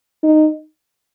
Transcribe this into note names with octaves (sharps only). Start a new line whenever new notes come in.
D#4